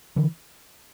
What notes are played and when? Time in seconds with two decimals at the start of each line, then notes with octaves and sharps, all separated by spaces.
0.16 D3 E3